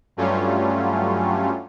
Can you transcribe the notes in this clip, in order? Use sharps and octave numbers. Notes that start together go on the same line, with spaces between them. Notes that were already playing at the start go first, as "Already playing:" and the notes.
G2 F#3 G3 A3 C#4 F4